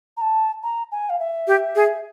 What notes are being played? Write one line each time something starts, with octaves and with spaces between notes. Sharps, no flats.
A#5
A5
A#5
G#5
F5
E5
G4
G#4